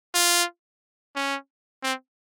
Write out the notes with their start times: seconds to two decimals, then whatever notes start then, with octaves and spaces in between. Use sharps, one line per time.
0.14 F4
1.16 C#4
1.83 C4